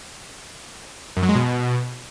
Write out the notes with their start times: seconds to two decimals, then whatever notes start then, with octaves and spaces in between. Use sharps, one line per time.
1.16 F#2
1.23 F#3
1.29 G#3
1.35 B2